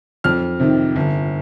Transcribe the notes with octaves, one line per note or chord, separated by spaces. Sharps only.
F2 F6
C3 D#3
G1